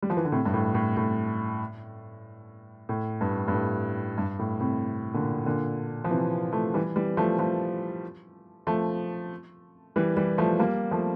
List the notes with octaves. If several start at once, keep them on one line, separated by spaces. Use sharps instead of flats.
G3
F3
E3
D3
A2 C3
G2
A2
A2
A2
A2
G2
G2
A2
G2
A2
A2 C3
A#2 D3
A#2 D3
F3
C3 E3
F3 A3
E3 G3
E3 G3
F3 A3
F3 A3
F3 A3
E3 G3
E3 G3
F3 A3
G3 A#3
F3 A3